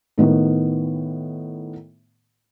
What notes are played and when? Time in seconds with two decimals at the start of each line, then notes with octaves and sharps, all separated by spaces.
0.18 A2 D#3 B3